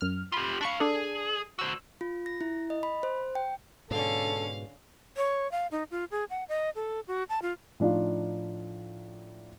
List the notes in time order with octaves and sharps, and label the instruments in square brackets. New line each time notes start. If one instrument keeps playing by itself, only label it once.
[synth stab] F#2 F6
[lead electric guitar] F4 G4 [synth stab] B5 C6
[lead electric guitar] D4 F5 [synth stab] B5 C#6 C#7
[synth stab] D4 A4 [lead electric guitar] G#4
[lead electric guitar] F#4 C5 [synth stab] E6
[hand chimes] F4
A#6
E4
D#5
B5
C5
G5
[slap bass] G#2 B2 [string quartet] D3 C#4 [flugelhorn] A4 [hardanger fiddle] F5
[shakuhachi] C#5
F5
D#4
F4
G#4
F#5
D#5
A4
F#4
A5
F4
[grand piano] A2 F3 D4 D#4 F4